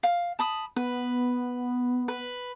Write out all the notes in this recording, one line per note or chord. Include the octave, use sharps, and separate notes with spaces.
F5
A5 B5 D#6
B3 B4
B4